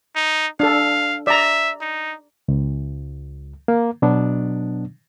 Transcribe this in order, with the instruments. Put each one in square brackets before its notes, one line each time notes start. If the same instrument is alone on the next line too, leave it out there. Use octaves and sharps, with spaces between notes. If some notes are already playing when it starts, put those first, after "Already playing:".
[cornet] D#4
[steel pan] D4 A4 [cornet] F5
[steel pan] D5 A#5 [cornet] E5
[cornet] D#4
[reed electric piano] C#2
A#3
B2 F#3 B3 D4